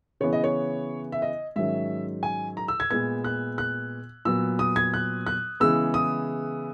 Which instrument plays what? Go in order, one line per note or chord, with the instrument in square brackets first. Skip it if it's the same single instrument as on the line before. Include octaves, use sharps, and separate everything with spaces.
[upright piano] C#3 E3 B3 C#5
D#5
C#5
E5
D#5
G#2 D#3 F#3 C#4 E5
G#5
A#5
E6
G#6
A#2 G#3 B3 G#6
F#6
F#6
A#2 F#3 B3 E6
D#6
G#6
F#6
F#6
C#3 E3 G#3 B3 E6
D#6